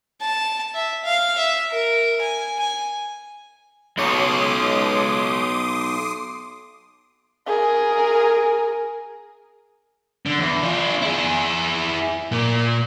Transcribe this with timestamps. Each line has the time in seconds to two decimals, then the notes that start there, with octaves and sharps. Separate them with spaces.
0.21 A5
0.74 E5
1.04 F5
1.38 E5
1.71 A#4
2.22 G#5
2.60 G#5
3.98 B1 G#3 C#5 C6 D6 D#6
7.47 G#4 A#4
10.26 D3
10.39 E2
10.63 D4 F4
11.02 E4 G#4
12.32 A#2